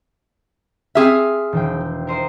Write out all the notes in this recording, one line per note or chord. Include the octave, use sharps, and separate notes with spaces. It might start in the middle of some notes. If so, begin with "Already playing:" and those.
C4 G#4 E5 F6
E1 D#3 G5
A#4 C5 D#5